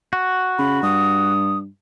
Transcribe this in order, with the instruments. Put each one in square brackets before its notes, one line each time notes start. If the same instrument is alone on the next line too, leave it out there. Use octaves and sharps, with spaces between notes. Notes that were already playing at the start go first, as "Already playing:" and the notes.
[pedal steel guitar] F#4
[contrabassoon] C#3 [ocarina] B5
[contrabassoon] G2 [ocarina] D#6